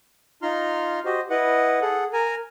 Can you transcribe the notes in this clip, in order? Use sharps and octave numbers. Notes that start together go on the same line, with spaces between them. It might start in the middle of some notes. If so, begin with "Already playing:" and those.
D#4 F4 A#5 C6 F6
F#4 G4 C5 D#5
E4 B4 D#5 F#5
G#4 A4 F#5
A#4 G#5 A#5